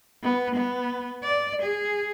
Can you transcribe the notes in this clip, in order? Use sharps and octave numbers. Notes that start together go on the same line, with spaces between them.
B3
B3
D5
G#4